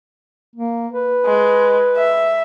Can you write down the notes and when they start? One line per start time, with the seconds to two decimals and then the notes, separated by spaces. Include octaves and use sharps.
0.56 A#3
0.93 B4
1.25 G#3
1.96 E5